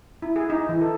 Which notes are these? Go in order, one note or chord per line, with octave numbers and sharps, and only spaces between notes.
E4
G#4
D#4
E3
A4